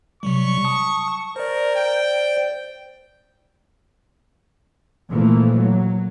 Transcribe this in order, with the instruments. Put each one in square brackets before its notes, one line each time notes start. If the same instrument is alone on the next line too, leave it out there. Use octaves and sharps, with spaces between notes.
[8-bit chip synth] C3 F#3 G3 [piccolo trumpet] C#6
[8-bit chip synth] A5 D#6
[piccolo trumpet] A#4 [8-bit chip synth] C5 D5
[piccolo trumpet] G5
[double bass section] A#2 E3 F3 A3 A#3
F#3